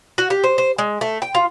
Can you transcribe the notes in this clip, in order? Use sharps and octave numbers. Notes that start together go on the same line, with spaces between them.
F#4
G4
C5
C5
G#3
A3
G5
F4